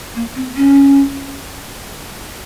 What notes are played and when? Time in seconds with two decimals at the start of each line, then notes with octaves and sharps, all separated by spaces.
0.15 A#3
0.35 C4
0.56 C#4